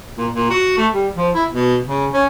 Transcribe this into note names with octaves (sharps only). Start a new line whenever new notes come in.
A#2
A#2
F#4
A3
G3
F3
E4
B2
C#3
C#4